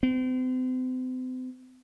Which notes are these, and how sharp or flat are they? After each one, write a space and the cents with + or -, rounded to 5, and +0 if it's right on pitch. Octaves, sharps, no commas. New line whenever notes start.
C4 -40